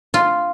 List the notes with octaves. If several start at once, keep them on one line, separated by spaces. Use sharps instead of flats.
F4